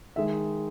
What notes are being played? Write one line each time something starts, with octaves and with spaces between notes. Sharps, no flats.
D#3 G#3 E5